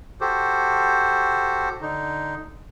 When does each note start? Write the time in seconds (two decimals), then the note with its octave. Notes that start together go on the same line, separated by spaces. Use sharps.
0.21 F#4 G4 A4 C5
1.81 D3 D#4